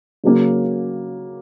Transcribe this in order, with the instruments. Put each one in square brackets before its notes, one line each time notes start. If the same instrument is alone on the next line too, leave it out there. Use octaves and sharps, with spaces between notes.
[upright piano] C#3 F#3 A#3 C#4